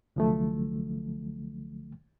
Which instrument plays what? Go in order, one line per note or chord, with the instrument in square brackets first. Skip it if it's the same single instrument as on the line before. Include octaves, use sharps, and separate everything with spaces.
[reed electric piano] C2 D3 F3 F#3 A3